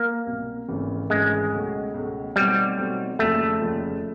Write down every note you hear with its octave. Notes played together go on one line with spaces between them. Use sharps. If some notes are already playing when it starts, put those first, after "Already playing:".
Already playing: A#3
C2 B2 F#3
G#1 F#2 C#3 E3 A3
G#1 F#2 C#3 E3 G#3 A3
C#2 B2 F#3 A3
C#2 B2 F#3 A3
B2 F#3 G3 A3 C4 D#4
B2 F#3 A3 C4 D#4
F1 D#2 C#3 F3 A3
F1 D#2 C#3 F3